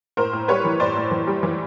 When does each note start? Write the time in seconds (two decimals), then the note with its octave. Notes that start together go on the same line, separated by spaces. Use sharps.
0.17 A2 A#4 C5
0.33 A2
0.48 G3 B4 C#5
0.65 E3
0.80 A2 C5 D5
0.96 A2
1.11 E3
1.27 G3
1.43 E3